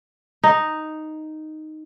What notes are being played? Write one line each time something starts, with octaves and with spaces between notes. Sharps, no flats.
D#4